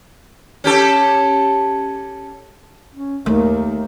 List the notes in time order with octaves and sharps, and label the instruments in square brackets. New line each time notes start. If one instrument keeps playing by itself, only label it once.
[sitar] C#4 G4 A4
[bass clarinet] C#4
[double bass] D#2 D#3 [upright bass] A3 [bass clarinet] A#3